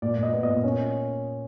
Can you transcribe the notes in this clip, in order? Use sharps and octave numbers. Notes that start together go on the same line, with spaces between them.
A#2 D5
A#2 D#5
B3
D#5
A#2
C#4